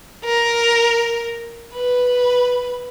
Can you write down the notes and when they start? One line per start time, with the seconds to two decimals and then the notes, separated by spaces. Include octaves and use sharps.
0.25 A#4
1.74 B4